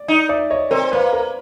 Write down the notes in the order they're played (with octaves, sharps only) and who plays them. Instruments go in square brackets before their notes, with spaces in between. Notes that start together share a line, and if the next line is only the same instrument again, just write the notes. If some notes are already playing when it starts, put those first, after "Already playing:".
Already playing: [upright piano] D5
[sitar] D#4
[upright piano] D5 E5
C#5 D#5
[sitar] C4 [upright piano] A#4 C5
[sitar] A#3 [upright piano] B4
[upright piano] A#4